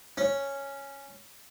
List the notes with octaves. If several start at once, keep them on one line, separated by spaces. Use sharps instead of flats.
C#4